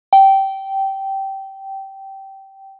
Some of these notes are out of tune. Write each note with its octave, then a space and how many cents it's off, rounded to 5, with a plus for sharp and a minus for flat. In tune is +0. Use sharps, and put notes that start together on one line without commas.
G5 -15